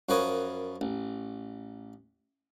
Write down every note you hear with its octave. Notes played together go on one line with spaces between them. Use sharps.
F#2 F3 A#4 B4 C#5 D#6
A1